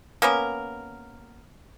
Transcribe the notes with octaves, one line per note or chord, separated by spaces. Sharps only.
A#3 B3 C#4 A#4